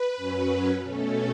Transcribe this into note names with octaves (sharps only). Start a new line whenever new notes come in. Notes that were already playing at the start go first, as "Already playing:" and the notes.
Already playing: B4
F#2 F#3 C#4
B2 A3 C#4 A4